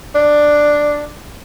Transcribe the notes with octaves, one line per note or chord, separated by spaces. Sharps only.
D4